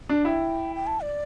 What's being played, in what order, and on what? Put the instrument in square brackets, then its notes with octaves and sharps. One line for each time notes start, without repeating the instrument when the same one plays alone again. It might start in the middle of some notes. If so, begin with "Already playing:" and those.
[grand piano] D4
[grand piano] E4 [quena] G5
[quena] G5
A5
D5